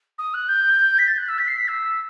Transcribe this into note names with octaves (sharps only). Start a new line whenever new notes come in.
D#6
F#6
G6
B6
A6
F#6
E6
B6
C7
B6
E6